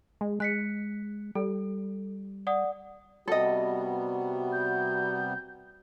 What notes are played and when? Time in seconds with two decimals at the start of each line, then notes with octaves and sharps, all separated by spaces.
0.21 G#3
0.40 G#3 F#6 B6 C#7
1.35 G3 A4
2.47 D5 F#5 D#6
3.28 C3 G3 B3 F#4 A4 D#5
4.52 G6